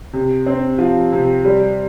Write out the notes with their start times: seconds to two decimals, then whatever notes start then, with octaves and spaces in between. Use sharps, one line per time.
0.13 C3
0.46 C4
0.78 F3
1.12 C3
1.45 G3